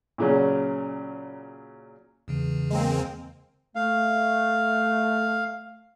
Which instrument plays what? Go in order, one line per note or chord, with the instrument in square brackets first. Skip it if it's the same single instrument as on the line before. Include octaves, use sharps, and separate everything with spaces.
[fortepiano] A#2 C#3 F#3 C#4
[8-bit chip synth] E2 C#3 E3
[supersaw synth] G#3 A#3 C4
[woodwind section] A3 [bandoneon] F5